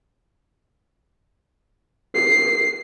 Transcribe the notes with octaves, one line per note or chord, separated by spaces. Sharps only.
C7